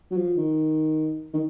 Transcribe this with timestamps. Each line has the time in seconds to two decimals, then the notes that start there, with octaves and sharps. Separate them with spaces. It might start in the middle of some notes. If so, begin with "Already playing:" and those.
0.11 F#3
0.17 F3
0.37 D#3
1.34 D#3